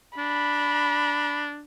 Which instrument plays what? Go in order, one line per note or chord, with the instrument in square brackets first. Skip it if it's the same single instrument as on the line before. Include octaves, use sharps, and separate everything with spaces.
[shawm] D4 [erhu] B5